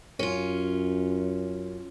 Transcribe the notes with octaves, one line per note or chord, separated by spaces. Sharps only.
F#2 C#4 F4